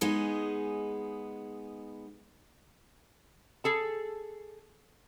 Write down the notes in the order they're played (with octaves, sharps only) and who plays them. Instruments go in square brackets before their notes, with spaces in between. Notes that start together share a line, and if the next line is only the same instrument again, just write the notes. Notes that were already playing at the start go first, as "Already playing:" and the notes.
[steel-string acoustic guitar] G#3 B3 D#4 G#4 D#5
[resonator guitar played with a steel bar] G#4 A4 A5